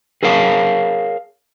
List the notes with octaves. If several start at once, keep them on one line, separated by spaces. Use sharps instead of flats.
G#4 A#4 C#5 F5 G#5 A5